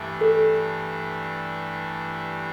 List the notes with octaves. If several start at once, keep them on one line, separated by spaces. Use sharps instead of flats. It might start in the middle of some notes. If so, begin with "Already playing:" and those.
Already playing: G2 E3 A3 D4
A4